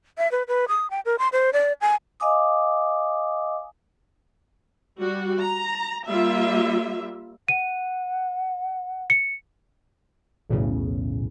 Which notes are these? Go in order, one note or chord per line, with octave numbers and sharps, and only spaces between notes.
E5
B4
B4
D#6
G5
A#4
C6
C5
D5
G#5
D#5 F5 G#5 D6 D#6
G3 F#4
A#5
G3 A#3 F4 E5
F#5 D#7
C#7
B1 E2 A2 C#3